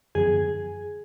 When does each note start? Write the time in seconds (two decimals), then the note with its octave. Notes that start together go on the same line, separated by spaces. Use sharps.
0.15 F#2 D3 F3 B3 G#4